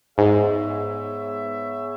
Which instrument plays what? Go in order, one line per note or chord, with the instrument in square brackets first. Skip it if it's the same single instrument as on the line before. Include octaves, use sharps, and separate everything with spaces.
[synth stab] G#2 [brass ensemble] B3 G#4 C#5 E5